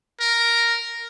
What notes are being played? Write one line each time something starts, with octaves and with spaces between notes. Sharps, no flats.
A#4